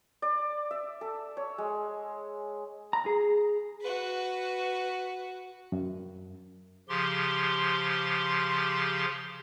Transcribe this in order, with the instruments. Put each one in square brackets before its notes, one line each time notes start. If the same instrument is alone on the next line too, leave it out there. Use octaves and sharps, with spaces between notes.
[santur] D5
E5
A4
C#5
G#3
[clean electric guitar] A#5
G#4
[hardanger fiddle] F#4 B4
[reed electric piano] F#2
[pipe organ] C#3 F3 G4 C6